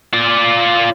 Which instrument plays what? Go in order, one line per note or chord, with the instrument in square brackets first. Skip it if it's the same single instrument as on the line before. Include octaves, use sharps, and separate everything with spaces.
[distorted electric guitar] F4 D5